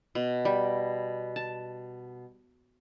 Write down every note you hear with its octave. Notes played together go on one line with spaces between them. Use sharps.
B2
G3
A5